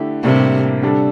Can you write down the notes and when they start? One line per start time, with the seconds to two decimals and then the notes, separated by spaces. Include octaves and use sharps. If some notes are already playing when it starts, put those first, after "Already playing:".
Already playing: D3 A3 E4 G4
0.23 A2 C3 G3 A#3 D4
0.82 D3 G3 D4 A4